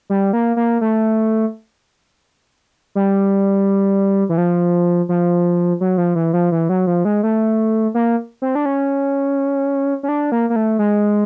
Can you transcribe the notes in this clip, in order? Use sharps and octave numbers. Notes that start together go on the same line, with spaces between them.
G3
A#3
A#3
A3
G3
E3
F3
F3
F#3
F3
E3
F3
E3
F#3
F3
G#3
A3
A#3
C4
D4
C#4
C#4
D4
A#3
A#3
A3
G#3